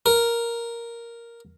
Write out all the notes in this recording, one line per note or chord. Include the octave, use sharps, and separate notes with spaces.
A#4